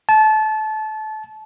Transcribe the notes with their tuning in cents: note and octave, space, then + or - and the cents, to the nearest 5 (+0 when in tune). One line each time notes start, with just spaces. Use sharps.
A5 -25